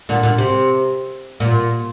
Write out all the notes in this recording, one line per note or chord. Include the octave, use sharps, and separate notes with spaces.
A#2 D3
A#2 D3
C3
A#2